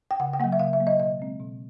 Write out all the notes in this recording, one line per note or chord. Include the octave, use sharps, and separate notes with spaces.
G5
C#3 F#5
G5
F#3 A#3 F#5
E5
C#3 F5
E5
F#3 A#3
D#5
B2 D#5
G#3 C4
B2